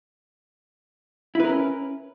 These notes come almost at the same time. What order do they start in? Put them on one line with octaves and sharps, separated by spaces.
E4 B4 A#4 C#4